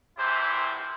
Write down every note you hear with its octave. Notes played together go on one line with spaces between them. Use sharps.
A#1 C3 E3 E4 C5